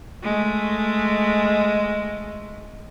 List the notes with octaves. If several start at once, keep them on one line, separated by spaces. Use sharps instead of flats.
G#3 A3